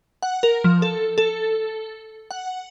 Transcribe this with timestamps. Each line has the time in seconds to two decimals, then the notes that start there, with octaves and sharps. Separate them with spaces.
0.23 F#5
0.43 A#4
0.64 F3
0.82 A4
1.18 A4
2.31 F#5